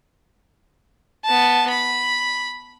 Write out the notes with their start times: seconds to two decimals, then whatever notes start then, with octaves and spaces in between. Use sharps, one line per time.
1.25 B3 A5
1.70 B5